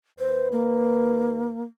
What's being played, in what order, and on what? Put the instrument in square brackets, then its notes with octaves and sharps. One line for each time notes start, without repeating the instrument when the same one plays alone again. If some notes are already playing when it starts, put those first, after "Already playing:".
[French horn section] D#2 B4 [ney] C5
[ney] A#3